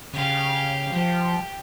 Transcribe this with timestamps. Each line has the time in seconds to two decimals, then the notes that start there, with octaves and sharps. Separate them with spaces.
0.13 C#3 G4 F5
0.92 F3 G4